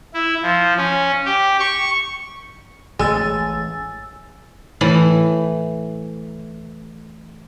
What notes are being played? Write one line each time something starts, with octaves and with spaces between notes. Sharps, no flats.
E4
F3
C#4
G4
C#6
A1 G#3 G#5 E6 A6
A2 E3